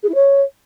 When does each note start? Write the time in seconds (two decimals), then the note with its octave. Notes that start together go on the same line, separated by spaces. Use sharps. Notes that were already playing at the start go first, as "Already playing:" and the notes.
0.03 G#4
0.09 E4
0.14 C#5